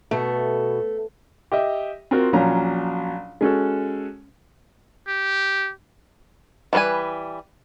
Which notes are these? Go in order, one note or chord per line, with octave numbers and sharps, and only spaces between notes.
B2 A3
G4 D#5 E5
C4 F4 F#4 A#4
A#1 A#2 F#3 C#4 A#5
G#3 C#4 F#4 A4
G4
E3 G3 D4 B4 G#5